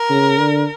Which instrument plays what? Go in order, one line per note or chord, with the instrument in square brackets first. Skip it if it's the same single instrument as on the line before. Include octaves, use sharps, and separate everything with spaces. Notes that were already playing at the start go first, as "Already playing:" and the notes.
Already playing: [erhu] A#4
[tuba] C#3
D3